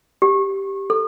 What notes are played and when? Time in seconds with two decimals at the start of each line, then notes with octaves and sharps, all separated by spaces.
0.22 G4
0.90 A4